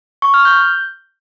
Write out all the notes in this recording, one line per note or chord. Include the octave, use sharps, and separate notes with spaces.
C#6
F6
G6